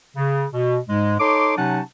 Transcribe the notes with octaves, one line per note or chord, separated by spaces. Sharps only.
C#3
B2
G#2 G#3
D#4 A4 C#5 C6 D6
C3 F#3 C#4 D#4 F#5 A5